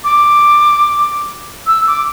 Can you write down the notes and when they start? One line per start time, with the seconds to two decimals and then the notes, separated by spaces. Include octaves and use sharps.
0.04 D6
1.66 E6
1.87 D6